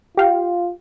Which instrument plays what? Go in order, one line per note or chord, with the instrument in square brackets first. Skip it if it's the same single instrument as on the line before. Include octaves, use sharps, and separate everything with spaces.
[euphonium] F4 [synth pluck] G4 F5 G5